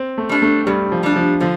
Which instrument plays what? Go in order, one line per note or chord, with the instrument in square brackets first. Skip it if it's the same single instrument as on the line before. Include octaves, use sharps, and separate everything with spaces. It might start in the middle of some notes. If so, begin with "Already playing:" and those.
Already playing: [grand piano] C4
A3
[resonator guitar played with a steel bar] G3 D4
[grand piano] A3
[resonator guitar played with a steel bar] G2 [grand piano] G3
[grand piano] F3
[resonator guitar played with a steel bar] G3 D4
[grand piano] F3
[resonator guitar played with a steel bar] D3 [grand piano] F3